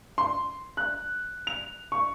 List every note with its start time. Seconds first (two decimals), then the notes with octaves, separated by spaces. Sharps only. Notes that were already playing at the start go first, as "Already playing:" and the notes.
0.18 C6
0.77 F#6
1.47 F7
1.92 C#6